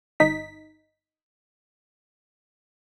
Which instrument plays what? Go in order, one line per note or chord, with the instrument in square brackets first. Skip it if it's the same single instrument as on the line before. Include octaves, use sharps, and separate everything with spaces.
[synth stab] G1 D#4 B6